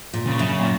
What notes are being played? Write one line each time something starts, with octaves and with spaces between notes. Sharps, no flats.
A#2
C#3
F#2
A#2